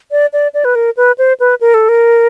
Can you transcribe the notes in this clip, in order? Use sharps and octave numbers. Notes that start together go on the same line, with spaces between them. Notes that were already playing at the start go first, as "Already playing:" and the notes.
D5
D5
D5
B4
A#4
B4
C5
B4
A#4
A4
A#4